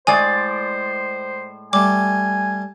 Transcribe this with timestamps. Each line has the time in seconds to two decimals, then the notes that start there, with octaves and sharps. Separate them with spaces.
0.07 A2 G#3 C5 D5 G#5
1.73 G3 A3 G#5 D6